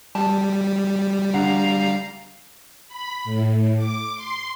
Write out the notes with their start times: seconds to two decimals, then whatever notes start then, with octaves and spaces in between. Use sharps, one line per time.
0.15 G3 A5
1.34 D3 F5 F#5 A#5
2.88 B5
3.24 A2
3.76 D6
4.14 C6